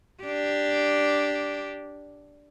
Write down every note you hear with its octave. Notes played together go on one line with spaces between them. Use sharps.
D4 G4